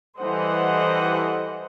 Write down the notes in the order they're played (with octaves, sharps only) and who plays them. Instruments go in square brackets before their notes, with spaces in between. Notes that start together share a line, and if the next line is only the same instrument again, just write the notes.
[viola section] E3 G3 A4 C5 D#5 F#5